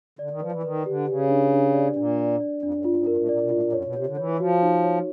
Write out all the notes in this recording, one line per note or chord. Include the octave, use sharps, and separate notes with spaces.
D3 D5
D#3
F3 B4
E3
D#3 B4
D3 G4
C#3 G4
D4
D4
D5
A#2 D4
D5
D5
F2 D4
F#2
G2 F4
G#2
G2 A#4
A2
A#2 D5
B2
A2 F4
A#2
F#2 C#5
B2
C3 C#5
D3
E3 C#5
F3 F#4
D#4
C#5